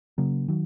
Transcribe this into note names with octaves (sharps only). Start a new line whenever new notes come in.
C#3 F#3 A#3
D#3 F#3